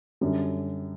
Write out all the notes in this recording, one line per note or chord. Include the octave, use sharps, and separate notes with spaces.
F#2 D3 G3